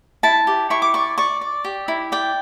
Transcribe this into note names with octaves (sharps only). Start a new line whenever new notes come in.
E4 A5
G4
E4 C#6
D6
D5 C#6
D5 C#6
D5
G4
E4
D5 G5